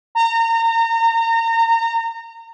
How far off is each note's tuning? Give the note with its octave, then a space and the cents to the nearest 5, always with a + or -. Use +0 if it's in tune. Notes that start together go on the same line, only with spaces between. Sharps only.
A#5 -30